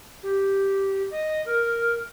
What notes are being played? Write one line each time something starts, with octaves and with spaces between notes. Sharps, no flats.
G4
D#5
A#4